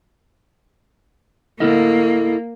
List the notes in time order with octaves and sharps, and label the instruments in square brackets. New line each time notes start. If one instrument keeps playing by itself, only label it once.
[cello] A#3 [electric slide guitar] E4 A4 D#5